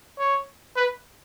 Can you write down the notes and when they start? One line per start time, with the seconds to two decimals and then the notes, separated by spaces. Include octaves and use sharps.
0.19 C#5
0.76 B4